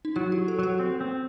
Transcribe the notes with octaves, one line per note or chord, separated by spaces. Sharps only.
D#4
F#3 E4
G4
F#3
A4
F#3 G4 A4
C4
C4